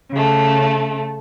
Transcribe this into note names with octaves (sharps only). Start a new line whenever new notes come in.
C#3 A3